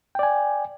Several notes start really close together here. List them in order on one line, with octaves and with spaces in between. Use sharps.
G5 D5 G#5